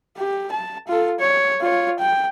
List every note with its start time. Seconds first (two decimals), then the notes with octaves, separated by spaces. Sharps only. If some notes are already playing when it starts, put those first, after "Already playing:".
0.18 G4
0.52 A5
0.88 F4 A4
1.19 C#5
1.61 F4 C#5
1.99 G5